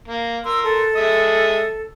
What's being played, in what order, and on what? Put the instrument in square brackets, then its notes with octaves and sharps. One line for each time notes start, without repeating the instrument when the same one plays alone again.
[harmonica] A#3
[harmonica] A#4 C6 [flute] E6
[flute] A4
[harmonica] G#3 E5 D#6